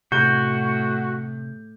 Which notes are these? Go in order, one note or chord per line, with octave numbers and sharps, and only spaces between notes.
A2 C3 F#4 G6